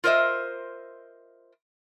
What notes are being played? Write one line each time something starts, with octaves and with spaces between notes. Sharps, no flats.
F4 A#4 C5 D#5 E5